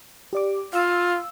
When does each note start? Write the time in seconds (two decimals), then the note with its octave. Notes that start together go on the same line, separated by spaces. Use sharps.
0.33 G4 D5 D6
0.73 F4 F5 E6